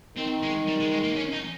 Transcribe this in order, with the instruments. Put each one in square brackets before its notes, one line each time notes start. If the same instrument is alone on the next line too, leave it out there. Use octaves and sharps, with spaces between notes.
[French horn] D#3 [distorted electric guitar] C4
[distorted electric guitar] G#3
G3
G#3
G#3
A#3
C#4
D#4